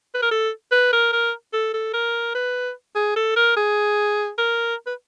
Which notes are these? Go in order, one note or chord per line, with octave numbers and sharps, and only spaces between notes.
B4
A#4
A4
B4
A#4
A#4
A4
A4
A#4
B4
G#4
A4
A#4
G#4
A#4
B4